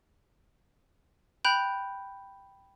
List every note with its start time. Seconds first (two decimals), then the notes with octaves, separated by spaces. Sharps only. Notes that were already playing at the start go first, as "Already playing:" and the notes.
1.45 G5 B5 F#6 G6 F7